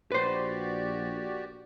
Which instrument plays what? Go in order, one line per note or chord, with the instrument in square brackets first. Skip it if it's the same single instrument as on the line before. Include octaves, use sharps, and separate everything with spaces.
[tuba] A#1 [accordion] F#4 G4 D5 [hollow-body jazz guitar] B4 C5